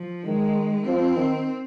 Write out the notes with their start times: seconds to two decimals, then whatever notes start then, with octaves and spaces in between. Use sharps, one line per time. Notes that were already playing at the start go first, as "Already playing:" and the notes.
Already playing: F3
0.25 D#3 G#3
0.86 F3 C4
1.17 D#3